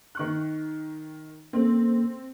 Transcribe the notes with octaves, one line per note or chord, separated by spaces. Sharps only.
D#3 C#6 F#6
A#3 C4 C#4 A4